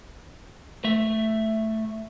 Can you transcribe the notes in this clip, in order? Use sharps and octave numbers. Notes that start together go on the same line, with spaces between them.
A3 E5